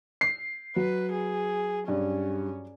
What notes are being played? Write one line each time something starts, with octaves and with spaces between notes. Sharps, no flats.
C7
F#3 B4
G#4
G2 C#4